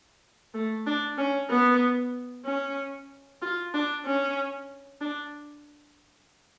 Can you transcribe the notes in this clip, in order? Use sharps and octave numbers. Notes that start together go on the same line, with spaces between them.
A3
D4
C#4
B3
C#4
F4
D4
C#4
D4